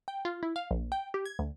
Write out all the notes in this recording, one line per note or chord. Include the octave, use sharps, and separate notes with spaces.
G5
F4
E4
F5
A#1
G5
G4
G#6
D2